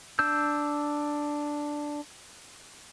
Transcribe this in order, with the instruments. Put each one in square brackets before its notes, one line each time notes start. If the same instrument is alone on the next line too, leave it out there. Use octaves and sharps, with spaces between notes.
[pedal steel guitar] D4 E6 G6